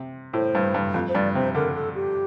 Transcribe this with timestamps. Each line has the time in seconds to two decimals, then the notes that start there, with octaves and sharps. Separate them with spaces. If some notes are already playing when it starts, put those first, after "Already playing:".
Already playing: C3
0.33 A2 C5
0.55 G2
0.74 G2
0.94 F2
1.09 C5
1.15 G2 D5
1.35 C3 C5
1.55 D3 A#4
1.75 A4
1.95 G4